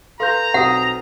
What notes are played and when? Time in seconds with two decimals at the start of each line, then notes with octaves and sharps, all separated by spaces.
0.20 A4 B4 F5 A#5 C6 G6
0.54 B1 C4 F#5 D#6